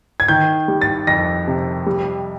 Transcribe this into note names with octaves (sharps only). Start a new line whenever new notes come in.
G#6
D#3 G6
G3
A6
F2 A#6
C3
G3